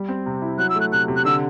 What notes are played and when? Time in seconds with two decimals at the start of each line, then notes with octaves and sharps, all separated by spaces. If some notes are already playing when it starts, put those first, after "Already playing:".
Already playing: G3
0.09 C4
0.26 C3
0.42 E4
0.58 F#3 F#6
0.70 E6
0.75 A3
0.81 F#6
0.92 C3 F#6
1.08 C3
1.16 F#6
1.25 D3 E6